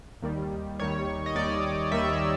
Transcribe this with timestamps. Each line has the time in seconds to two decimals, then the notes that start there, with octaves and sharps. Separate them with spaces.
0.22 D#2 D#3 G3
0.79 D#2 D#3 G3 C#5
1.26 D#5
1.35 D#2 D#3 G3 D5
1.92 D#2 D#3 G3 E5